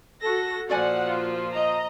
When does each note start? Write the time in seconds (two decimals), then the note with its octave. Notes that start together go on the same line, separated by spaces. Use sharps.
0.21 F#4 A4 A#6
0.70 A#2 F3 F#4 D5 F#5 G#5
1.06 F4
1.53 D#5 A#5